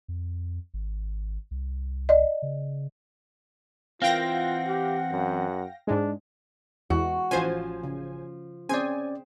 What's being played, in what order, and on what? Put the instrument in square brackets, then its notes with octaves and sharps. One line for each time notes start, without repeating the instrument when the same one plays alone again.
[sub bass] F2
G#1
C2
[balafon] D5 D#5
[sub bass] C#3
[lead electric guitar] E3 C4 [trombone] F4 [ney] A#4 [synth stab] F5 G5 A#6
[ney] F#5
[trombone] G4
F#2
[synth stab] G#2 G#3 [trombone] D4
[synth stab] E2 [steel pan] E3 G#3 [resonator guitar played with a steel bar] F#4
[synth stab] A1 C5 G#5 [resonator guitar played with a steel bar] F3 [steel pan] C#4 F4 F#4
[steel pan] C#3
[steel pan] C4 G#4 C5 [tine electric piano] C#4 D5 [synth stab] G#5